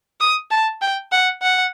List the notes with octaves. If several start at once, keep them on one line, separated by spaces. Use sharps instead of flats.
D#6
A5
G5
F#5
F#5